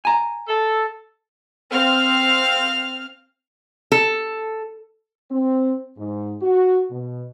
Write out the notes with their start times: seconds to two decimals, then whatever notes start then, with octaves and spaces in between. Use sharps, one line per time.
0.05 G#5 A#5
0.47 A4
1.71 C4 F5 F6
3.92 A4
5.31 C4
5.98 G#2
6.42 F#4
6.90 B2